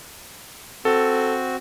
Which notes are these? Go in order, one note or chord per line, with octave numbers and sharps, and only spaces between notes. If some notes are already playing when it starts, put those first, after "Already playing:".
C4 F#4 A4